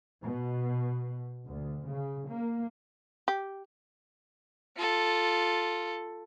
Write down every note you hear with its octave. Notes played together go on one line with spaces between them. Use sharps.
B2
D2
C#3
A#3
G4
F4 A4